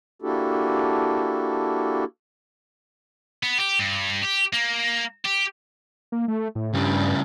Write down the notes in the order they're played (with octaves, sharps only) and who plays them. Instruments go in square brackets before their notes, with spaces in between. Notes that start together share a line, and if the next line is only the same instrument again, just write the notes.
[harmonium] A#3 D4 E4 F#4 G4 A4
[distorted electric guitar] B3
G4
G2
G4
A#3
G4
[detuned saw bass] A#3
A3
A2
[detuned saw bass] G2 [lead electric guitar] C#3 G3